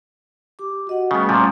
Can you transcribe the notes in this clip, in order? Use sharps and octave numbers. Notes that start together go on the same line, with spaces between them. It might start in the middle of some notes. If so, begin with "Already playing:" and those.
G4 D6
F#4 D#5 F#5
C#3 G3 A3 B3 C#4
A#2 F3